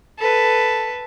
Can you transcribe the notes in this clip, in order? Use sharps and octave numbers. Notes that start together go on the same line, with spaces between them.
A4 B4